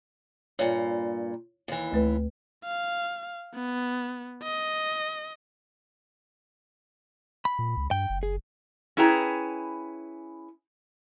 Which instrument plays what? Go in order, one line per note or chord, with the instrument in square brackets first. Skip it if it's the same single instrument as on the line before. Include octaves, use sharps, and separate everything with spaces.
[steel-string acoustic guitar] G2 A#2 [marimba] C#5
[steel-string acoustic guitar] D#2 E3
[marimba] D2 A3 B4
[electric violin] F5
B3
D#5
[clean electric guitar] B5
[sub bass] A#2
C#2
[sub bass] G2 [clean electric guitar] G5
[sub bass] F#1
[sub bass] F#1 [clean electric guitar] G#4
[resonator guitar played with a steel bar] C#4 E4 G#4 B4 G5 A#5